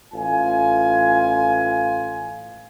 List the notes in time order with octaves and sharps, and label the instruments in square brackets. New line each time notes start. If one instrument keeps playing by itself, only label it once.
[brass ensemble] A1 F4 G#5